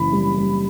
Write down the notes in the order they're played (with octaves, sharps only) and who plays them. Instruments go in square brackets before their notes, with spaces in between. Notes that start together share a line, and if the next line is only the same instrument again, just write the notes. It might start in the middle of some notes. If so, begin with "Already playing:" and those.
Already playing: [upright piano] F#1 E3 B5
G3
G3